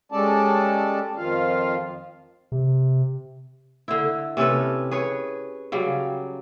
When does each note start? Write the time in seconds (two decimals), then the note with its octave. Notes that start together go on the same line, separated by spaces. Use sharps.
0.12 G3 G#3 C#4 A4 D5 A5
1.17 F2 D#3 F3 F4 F5
2.52 C3
3.88 D3 E4
4.37 C3 C#4 A4 B4
4.91 G#4 B4 C#5
5.72 C#3 F#3 G3